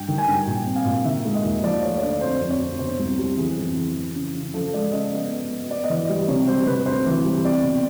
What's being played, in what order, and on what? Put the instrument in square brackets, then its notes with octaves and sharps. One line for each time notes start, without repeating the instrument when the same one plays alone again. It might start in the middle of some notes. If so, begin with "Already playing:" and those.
Already playing: [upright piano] G2 G5
D#3
G#5
G2
A#2
C4
F5
A#2
D#3 E5
G#3
D#5
D#2
F3 D5
A3 C#5
C#5
D3 D5
F2 C5
F2
C#5
F2
B2 C5
C2
G3
E3 G#4
F2
E3
E3
C#3
C#3
F3 A4
G#3 D5
C#3 D#5
B3
B3
B3
B3 D5
D#5
E3
D5
G3
C3 C#5
G3 C5
C3 B4
D2 C5
E3
G3
C4 D5
B2